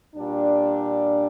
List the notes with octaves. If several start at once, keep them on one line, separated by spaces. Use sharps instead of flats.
A#2 G3 D4